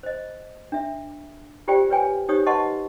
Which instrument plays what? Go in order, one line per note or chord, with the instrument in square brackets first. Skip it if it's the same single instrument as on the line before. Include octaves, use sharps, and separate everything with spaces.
[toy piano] C5 D#5
D4 E5
F4 G4 C5 D5 G5
B4 C#5 G5 G#5
D#4 G4 C5 C#5 D#6
B4 D#5 F#5 A5 C6 C#6